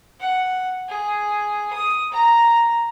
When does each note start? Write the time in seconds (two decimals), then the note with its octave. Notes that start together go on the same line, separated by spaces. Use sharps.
0.20 F#5
0.89 G#4
1.74 D#6
2.13 A#5